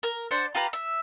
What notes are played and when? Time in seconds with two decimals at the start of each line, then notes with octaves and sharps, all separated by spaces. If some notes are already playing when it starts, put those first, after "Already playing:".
0.03 A#4
0.31 D4 C5 F#5
0.55 F4 G4 B4 A#5
0.73 E5